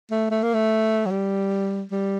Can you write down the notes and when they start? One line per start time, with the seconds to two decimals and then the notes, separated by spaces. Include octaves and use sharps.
0.11 A3
0.31 A3
0.43 A#3
0.54 A3
1.06 F#3
1.11 G3
1.91 G3